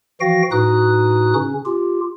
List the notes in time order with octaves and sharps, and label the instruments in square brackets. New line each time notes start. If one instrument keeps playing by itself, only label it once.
[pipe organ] E3 F3 F#4 F5 G5 A#6
A2 D#4 F#4 B4 D#6 F#6
C#3 C#4
F4 G4